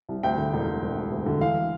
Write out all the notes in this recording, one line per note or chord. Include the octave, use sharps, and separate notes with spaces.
C2
D2 G5
D3
E1
E1
E1
E1
D2
D3
E3 F5